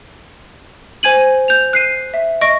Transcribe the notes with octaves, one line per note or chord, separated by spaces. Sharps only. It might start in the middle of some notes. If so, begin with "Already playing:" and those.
C5 G#5 G#6 D#7 F#7
G6 F7
F#6 C7 D#7
E5
D#5 C#6 A#6 D7